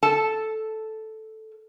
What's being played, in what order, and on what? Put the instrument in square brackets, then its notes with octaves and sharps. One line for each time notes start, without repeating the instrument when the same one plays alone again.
[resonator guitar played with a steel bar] A4 A5